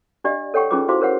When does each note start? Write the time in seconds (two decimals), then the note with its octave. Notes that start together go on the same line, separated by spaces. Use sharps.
0.24 D4 G4 D5 D#5 F5
0.54 A4 C#5 F#5 G5 C#6
0.71 C#4 D#4 F4 G#4 B4 D6
0.88 E4 F#4 C5 F5 C6 D6
1.00 G#4 A#4 C5 C#5 F5 F#5